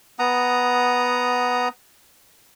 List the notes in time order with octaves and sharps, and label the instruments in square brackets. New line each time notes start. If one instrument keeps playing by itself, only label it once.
[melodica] B3 F#5 A#5 D#6